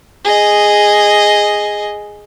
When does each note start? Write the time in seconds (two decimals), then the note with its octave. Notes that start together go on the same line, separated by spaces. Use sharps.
0.25 G#4 D#5